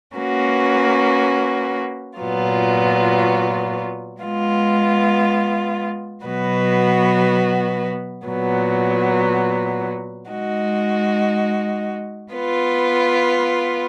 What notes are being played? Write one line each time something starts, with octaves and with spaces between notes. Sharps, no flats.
A#3 C#4 F#4 B4
A#2 F#3 B3 F4
G#3 B3 F4
B2 F#3 B3 F#4 B4
A#2 F#3 B3
G#3 D#4 F#4
B3 F4 B4